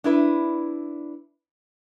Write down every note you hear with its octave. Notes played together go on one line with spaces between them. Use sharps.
D4 E4 B4